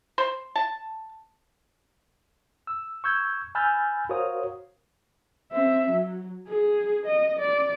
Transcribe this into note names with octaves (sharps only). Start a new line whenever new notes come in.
C5
A5
E6
C#6 E6 G6 G#6
G#5 B5 E6 F6 G6 A6
F#4 A#4 C5 C#5 F5 D#6
C4 E5
F#3
G#4
D#5
D5